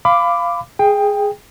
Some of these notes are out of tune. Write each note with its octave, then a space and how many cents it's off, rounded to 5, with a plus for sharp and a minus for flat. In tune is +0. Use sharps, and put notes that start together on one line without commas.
F5 -10 B5 +25 D6 +0
G#4 +0 G5 +20